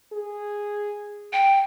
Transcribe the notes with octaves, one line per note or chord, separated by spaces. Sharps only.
G#4
G5